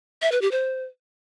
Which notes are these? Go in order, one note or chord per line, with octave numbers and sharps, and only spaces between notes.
E5
B4
G4
C5